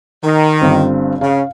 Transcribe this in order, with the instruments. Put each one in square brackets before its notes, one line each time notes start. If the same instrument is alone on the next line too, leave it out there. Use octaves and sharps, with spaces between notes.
[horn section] D#3
[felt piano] G1 G2 C4
[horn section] C#3 [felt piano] F5